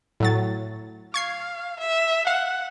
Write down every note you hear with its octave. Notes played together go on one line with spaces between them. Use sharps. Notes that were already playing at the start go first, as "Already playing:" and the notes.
A2 F#3 A6
F5 C#6 G#6 C7
E5
F5 F#5